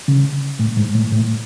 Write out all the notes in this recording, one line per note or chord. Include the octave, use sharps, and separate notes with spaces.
C#3
A2
G#2
A2
A2